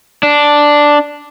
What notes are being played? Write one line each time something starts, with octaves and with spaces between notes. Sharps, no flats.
D4